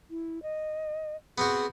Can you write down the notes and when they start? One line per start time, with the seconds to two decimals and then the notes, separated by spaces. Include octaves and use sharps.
0.10 E4
0.43 D#5
1.38 B3 C4 F#4 G#4